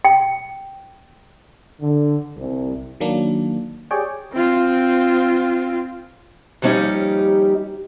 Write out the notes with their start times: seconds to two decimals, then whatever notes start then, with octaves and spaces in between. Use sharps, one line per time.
0.05 G5
1.81 D3
2.37 C2
3.00 D#3 F#3 A#3 D4
3.91 G4 G#4 C#5 D5 G5
4.33 C4 F4
6.62 D#2 F3 G3 C#4 D#4 G4